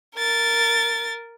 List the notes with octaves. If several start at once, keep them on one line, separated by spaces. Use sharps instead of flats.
A#4 A6